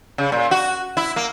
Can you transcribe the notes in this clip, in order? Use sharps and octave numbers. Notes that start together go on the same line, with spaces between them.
C#3
A#2
F#4
E4
A#3